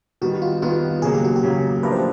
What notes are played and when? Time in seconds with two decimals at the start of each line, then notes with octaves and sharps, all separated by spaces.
0.22 D#3 G3 B3 F#4
0.42 F4
0.62 D#3 G3 B3 F4
1.02 C#3 F#3 A#3 G#4
1.14 G4
1.24 F#4
1.36 G4
1.43 C#3 F#3 A#3
1.83 F3 A3 D4 G4 A#4 B4
1.92 C5